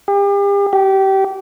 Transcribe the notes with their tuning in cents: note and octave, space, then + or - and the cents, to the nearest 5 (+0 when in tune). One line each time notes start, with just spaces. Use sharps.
G4 +40
G4 -25